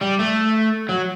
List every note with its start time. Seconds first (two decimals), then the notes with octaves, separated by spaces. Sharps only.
0.01 G3
0.19 A3
0.89 F#3